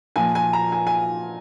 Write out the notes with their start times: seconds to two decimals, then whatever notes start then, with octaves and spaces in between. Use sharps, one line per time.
0.16 A#2 F3 G#5
0.35 G#5
0.53 A#5
0.72 G#5
0.87 G#5